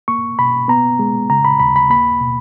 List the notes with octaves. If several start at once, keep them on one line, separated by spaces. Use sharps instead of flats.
A#3 C#6
B2 B5
B3 A#5
G#3
C#3 A#5
B5
D#2 B5
B5
A#3 B5
B2